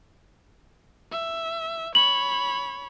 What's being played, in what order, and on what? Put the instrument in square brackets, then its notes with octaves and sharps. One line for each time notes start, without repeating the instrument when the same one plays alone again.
[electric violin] E5
[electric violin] C#5 B5 [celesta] F#7